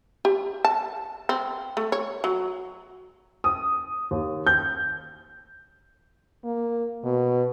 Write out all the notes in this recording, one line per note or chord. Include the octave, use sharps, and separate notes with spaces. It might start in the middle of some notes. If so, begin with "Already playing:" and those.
G4
A5
C4
A3
C#5
F#3
D#6
D#2
G6
A#3
B2